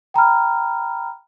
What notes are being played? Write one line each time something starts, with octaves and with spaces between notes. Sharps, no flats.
G5 A#5 B5 F6